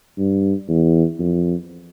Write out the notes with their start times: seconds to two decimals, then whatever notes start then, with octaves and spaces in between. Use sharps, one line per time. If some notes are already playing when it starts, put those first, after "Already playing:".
0.18 G2
0.68 E2
1.19 F2